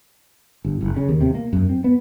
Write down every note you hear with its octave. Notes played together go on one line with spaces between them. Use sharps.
G1
F#1
C#3
D#2
C3
A#3
F#2
C4
B3